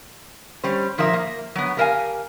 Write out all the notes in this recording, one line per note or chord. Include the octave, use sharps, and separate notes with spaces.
G3 C#4 C5
A#2 F3 D#4 A#4 E5
A#3
F#3 B3
A3 G4 A#4 E5 F5 G#5